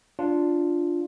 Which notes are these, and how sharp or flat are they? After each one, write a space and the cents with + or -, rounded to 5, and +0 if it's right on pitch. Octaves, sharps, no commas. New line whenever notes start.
D4 +0 F4 +0